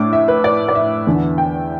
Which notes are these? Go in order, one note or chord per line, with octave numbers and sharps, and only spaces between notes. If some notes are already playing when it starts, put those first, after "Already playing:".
Already playing: A2 A3 D4 D6
E5
B4
D5
D5
E5
E2 D3 B3 D4
G5